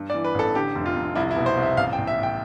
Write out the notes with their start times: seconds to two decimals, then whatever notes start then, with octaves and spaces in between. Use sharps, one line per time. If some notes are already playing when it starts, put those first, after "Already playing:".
Already playing: G2
0.10 D5
0.14 E3
0.24 B4
0.35 A1 A4
0.55 D3 G4
0.75 F1
0.86 F4
0.96 F1
1.15 C2 E4
1.31 E4
1.36 B2
1.46 C5
1.57 C2
1.63 E5
1.77 A1 F5
1.93 G5
1.98 A1
2.07 E5
2.18 A2 G5